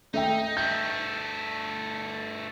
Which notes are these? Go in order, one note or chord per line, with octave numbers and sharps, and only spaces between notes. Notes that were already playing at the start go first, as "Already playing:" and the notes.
A3 D#4 E5 G5
G2 A3 G6